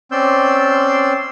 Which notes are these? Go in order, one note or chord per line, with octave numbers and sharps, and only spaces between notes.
C4 C#4 D5 C6 E6 G6